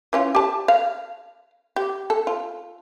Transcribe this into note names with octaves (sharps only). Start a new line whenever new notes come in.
E3 C#4 F4
G4 A5
F5
G4
A4
F4